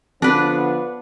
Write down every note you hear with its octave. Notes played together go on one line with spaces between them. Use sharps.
D3 F3 B3 D4 B4